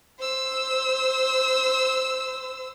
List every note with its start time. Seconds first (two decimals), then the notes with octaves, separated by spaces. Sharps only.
0.19 C5 E6